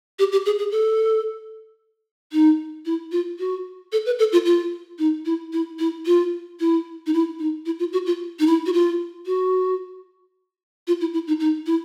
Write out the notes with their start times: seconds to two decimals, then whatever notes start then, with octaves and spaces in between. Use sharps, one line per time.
0.19 G4
0.32 G4
0.46 G#4
0.59 G#4
0.71 A4
2.32 D#4
2.86 E4
3.12 F4
3.39 F#4
3.92 A4
4.06 B4
4.19 A4
4.32 F4
4.45 F4
4.99 D#4
5.25 E4
5.53 E4
5.79 E4
6.06 F4
6.60 E4
7.06 D#4
7.13 E4
7.39 D#4
7.66 E4
7.79 F4
7.93 F#4
8.06 F4
8.39 D#4
8.47 E4
8.66 F#4
8.73 F4
9.26 F#4
10.87 F4
11.01 E4
11.13 E4
11.27 D#4
11.40 D#4
11.66 E4